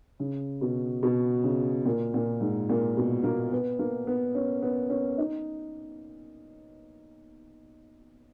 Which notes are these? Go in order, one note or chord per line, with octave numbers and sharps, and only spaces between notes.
C#3
B2
B2
C#3
A#2
A#2
G#2
A#2
B2
A#3
B3
A#3
B3
C#4
B3
C#4
D#4